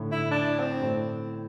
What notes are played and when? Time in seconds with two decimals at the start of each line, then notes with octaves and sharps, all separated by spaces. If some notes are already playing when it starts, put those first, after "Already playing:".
Already playing: A2 D3
0.11 E4
0.31 D4
0.59 C4
0.81 A2